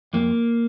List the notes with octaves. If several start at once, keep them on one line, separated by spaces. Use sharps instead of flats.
F2 A#3